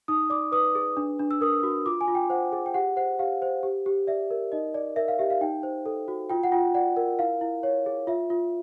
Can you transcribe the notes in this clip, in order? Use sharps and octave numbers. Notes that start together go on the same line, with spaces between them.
D#4 D#6
D5 D6
B4 D#6
G#4
D4
D4
E6
A#4 D#6
F#4
F4 D6
G#5
F4
G5
C5 F#5
G#4
G5
G4 F#5
C5 F#5
G4 F5
C5
G4
G4
D5 E5
A#4
D#4 D#5
D5
A#4 E5
F5
G4 E5
F5
D#4 G5
C5
A4
F#4
F4 G5
F#5
F4 G5
D5 F#5
A#4
E4 F5
E4
C#5
G#4
F4 E5
F4